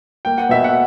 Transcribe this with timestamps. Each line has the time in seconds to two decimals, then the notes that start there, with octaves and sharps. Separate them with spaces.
0.25 A#3 G5
0.38 F#5
0.49 B2 E5
0.64 F#5